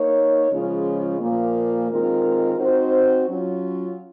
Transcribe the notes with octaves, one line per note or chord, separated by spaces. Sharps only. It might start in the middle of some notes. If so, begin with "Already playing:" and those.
Already playing: A#3 D#4 A#4 C#5
C#3 F3 G#3 C#4 F4
A#2 F3 A#3
D#3 G#3 C4 F4 A#4
C4 D#4 F#4 C5
F#3 C#4 F4